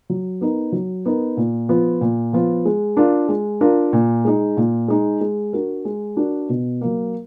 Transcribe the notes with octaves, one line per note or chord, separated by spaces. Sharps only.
F#3
B3 D#4 A#4
F#3
B3 D#4 A#4
A#2
F3 B3 F4
A#2
F3 B3 F4
G#3
D4 F4 A#4
G#3
D4 F4 A#4
A#2
G#3 D#4
A#2
G#3 D#4
G#3
D4 F#4 A#4
G#3
D4 F#4 A#4
B2
F#3 A#3